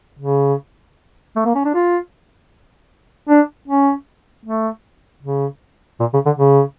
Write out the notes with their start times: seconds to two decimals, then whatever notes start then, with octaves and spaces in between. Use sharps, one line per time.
0.19 C#3
1.36 A3
1.45 A#3
1.55 C#4
1.65 D4
1.74 F4
3.29 D4
3.68 C#4
4.45 A3
5.23 C#3
6.00 A#2
6.14 C#3
6.26 D3
6.38 C#3